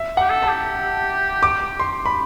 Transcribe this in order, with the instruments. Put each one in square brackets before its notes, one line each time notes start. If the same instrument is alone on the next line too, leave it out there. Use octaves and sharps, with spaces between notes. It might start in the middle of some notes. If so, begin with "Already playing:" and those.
Already playing: [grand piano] E5
[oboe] G4 [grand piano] F#5
[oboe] A4
[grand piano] A5
[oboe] G4
[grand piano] D6
C6
B5